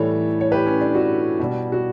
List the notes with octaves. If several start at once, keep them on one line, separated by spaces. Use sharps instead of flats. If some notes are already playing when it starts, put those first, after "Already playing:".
Already playing: A2 E3 G3 A4 C#5
C#5
G4 B4
C#4
D4
D4 F#4
B2 G3
F#4